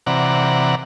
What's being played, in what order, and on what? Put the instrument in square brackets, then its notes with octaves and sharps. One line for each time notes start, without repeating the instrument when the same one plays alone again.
[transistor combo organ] C3 E3 D5 F#5 A#5